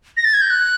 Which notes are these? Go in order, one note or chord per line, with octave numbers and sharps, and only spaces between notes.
A#6
A6
G#6
G6
F#6